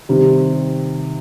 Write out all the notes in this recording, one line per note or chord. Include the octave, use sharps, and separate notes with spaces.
C3 D#3 G3 C4